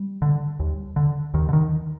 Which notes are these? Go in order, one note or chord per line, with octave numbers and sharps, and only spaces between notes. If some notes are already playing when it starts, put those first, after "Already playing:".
Already playing: G3
D3
D#2
D3
D#2 D#3
D3
D#3